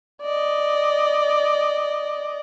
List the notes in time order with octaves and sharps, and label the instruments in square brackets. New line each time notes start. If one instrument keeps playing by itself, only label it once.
[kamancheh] D5 D#5